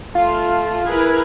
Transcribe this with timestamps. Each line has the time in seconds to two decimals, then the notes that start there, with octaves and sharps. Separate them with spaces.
0.15 A3 F4
0.87 E4 G#4 A#4 B4 G#6